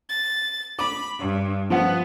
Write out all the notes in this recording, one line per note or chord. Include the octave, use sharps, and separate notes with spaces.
A6
B5 D6
G2
F3 B3 F#5